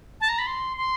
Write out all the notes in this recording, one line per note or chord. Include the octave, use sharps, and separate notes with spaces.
A5
A#5
B5
C6
C6